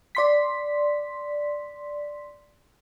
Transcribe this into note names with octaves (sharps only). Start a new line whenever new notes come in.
D5 C6 B6